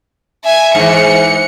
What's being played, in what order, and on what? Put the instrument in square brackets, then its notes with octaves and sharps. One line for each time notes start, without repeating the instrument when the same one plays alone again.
[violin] E5 G#5
[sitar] G#2 E3 [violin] C#7